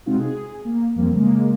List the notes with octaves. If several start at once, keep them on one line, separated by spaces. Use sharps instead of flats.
C3 G#3 C4 D#4 F4 F#4
G#4
A#3
F2 F3 G3 A#3 C4
C#3 G#3 A#3